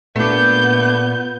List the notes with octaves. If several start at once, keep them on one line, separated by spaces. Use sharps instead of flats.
A#2 A3 B3 D4 G6